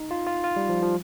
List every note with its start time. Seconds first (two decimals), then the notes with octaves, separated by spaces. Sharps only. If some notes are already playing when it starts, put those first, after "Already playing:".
Already playing: D#4
0.11 F4
0.27 F4
0.44 F4
0.56 G3
0.69 F3
0.82 F3